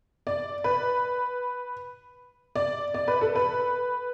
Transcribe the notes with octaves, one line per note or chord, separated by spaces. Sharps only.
D5
B4
D5
D5
B4
A4
B4